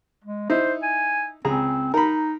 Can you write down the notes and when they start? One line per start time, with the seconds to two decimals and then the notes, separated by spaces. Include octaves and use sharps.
0.24 G#3
0.50 D#4 E4 C5
0.83 G#5
1.45 C#2 C4 G#4 A#5
1.94 D#4 A#4 B5